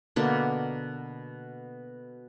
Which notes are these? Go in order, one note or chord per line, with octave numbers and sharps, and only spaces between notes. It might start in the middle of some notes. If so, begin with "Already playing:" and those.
B2 D3 A#3 D4